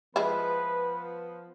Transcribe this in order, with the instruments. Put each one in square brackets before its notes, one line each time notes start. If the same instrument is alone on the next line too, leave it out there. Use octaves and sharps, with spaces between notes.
[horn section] F3 B3 [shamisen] G#3 E4 [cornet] B4